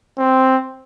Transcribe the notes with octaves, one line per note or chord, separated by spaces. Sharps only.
C4